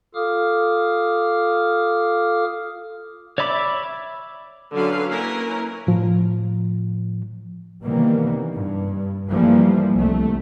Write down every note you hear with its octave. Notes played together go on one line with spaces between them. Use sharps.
F4 A4 F5 D6 D#6 F6
C#5 D5 E5 B5 D6
D3 F#3 C#4 B4 F5
A#3 C#4 E4 A#4 B4
A2 F3
C3 D#3 E3 G3 A#3 B3
G2
E3 F3 G3 A3 A#3
C2 A3